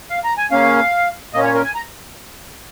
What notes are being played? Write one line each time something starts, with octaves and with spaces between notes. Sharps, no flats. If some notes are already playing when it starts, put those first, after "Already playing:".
F5
A#5
G#5
C#3 A#3 C#4 F5
A#2 A#3 C#4 D#5
C#5
A#4
G#5
A#5